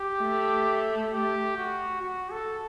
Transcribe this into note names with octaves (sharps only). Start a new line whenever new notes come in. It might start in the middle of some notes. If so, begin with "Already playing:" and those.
Already playing: G4
A3
G4
F#4
F#4
A4